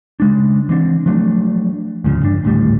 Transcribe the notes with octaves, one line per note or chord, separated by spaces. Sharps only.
C#3 G#3 D4
E3 C4 D4
F3 F#3 A3 D4
D2 G#2 C#3 F3
A1 G2 D4
G#1 D2 A2 G3